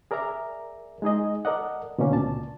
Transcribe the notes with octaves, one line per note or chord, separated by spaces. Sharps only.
G#4 A#4 D5 E5 A#5
G#3 D#4 G#4 D#5
A4 A#4 D5 D#5 F#5
B2 D3 A3 A#3 C#4
C#2 A#2 D5 A5